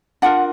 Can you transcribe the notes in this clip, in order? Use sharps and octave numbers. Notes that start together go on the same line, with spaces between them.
D4 F4 A#4 F#5